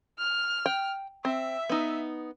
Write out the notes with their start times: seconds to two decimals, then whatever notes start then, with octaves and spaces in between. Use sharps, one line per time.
0.18 F6
0.66 G5
1.25 C4 E5
1.69 B3 D#4